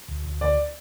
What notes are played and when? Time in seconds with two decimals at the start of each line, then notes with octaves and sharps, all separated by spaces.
0.09 D2
0.25 D2
0.41 D2 D5